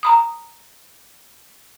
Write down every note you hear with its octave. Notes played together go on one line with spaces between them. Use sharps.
A#5 B5 D#6